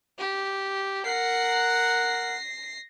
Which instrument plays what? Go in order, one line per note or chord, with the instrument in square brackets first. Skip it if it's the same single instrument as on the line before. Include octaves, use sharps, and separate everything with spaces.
[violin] G4
[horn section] A#4 F#5 [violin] A#6 C7